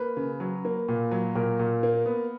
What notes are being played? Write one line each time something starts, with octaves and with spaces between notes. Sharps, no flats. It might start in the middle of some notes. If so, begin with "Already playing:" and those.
Already playing: A#3 B4
C#3
F#3
A#3
A#2
F#3
A#2 A#4
A#2
A#3
B3